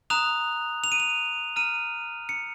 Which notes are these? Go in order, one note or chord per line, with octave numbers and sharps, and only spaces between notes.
A#5 D#6 F#6 F7
F7
D#7
F7
A#5 F6 D#7
C#7